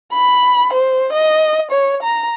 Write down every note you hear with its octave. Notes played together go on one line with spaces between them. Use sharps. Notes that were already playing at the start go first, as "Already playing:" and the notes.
B5
C5
D#5
C#5
A#5